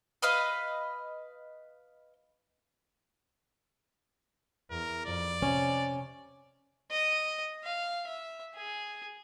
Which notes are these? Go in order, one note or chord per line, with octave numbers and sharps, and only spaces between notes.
B4 D#5 F5
E2 A#4
F2 D5
C3 C#4
D#5
F5
E5
G#4